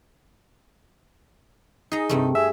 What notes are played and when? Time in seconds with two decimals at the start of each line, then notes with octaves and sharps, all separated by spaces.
1.92 D#4 G#4 A#5
2.09 G2 C3 G3 A3
2.35 G#4 E5